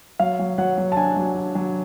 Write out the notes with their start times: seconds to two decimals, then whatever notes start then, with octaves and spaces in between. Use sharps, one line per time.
0.19 F#3 F5
0.39 F#3
0.58 F#3 F#5
0.78 F#3
0.92 A5
0.97 D4 G#5
1.16 F#3
1.35 D4
1.55 F#3